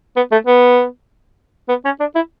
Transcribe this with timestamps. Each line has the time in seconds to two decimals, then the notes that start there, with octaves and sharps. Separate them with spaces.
0.16 B3
0.32 A3
0.47 B3
1.69 B3
1.85 C#4
2.00 D4
2.15 E4